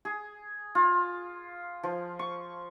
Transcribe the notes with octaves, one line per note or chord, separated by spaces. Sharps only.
G#4
F4
F3
C#6